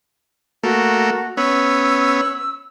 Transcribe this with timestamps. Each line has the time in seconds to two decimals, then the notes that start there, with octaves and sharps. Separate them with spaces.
0.63 A3 A#3 F#4
1.37 B3 C#4 E6